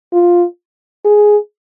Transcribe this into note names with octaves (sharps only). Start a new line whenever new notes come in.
F4
G#4